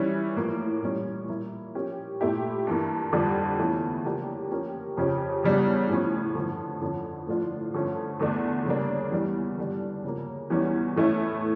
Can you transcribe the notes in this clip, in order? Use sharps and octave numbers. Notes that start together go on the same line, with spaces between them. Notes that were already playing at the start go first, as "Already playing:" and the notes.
Already playing: E3 G3 C#4 E4
A2 F3 A#3
A#2 G3 C#4
A#2 G3 A#3 E4
F3 C#4 G4 A#4
A#2 A3 E4 G4
G2 E3 A#3
F2 D3 G3 D4 G4
E2 E3 A3 C#4 E4
C#3 F3 A#3 D4 G4
F3 A#3 C#4 G4 A#4
F2 C#3 F3 C#4 G4
E2 C#3 G3 D4
A2 F3 C#4
G2 D3 F3
F2 D3 F3 C#4
A2 F3 A3 D4 F4
G2 D3 F3 A3 C#4
E2 D3 A3 D4
C#3 G3 A#3 D4
E2 E3 G3 C#4
G2 D3 G3 D4
C#3 F3 A#3
E2 E3 G3 C#4
A2 E3 A3 C#4 E4